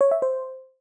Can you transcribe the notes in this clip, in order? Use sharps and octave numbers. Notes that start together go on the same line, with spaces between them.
C#5
E5
C5